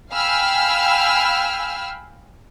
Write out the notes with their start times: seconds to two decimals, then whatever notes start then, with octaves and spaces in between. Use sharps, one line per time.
0.14 F5 G5 G#5 B5 E6 F6